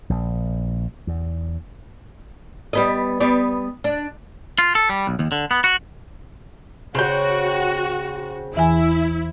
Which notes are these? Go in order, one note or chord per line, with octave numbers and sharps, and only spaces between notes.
A#1
E2
G3 B3 D#5
G3 B3 D5
D4
F4
A4
G3
B1
D#2
D3
B3
F#4
C#3 F#4 C5 C#5 G5
E2 E3 E4 G#5